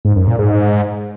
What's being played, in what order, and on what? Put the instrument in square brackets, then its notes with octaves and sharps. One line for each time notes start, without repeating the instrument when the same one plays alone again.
[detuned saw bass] G#2
F#2
A#2
G#2